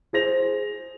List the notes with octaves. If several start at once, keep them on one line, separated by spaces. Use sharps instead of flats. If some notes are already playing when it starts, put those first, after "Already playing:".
G#4 C5 A#6 F7